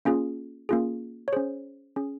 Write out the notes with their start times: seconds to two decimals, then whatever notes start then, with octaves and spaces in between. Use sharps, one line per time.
0.05 A#3 C#4 F4 G#4
0.69 A#3 C#4 F4 G#4
1.28 C#5
1.32 C#4 G#4 C5
1.96 C#4 G#4